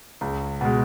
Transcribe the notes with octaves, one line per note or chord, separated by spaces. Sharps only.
C#2
B2 G#3